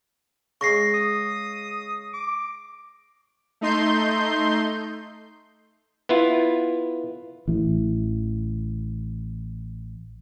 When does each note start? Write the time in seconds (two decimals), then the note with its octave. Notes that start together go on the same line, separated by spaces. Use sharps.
0.61 C#3 G#3 C#6 A#6 C7
0.94 D#6
2.14 D6
3.61 A3 D#4 C6 G6
6.09 B3 E4 F4
7.48 A1 E3